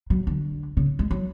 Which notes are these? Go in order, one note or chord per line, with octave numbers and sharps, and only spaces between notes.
F#3
D3
C#3
G#3
F#3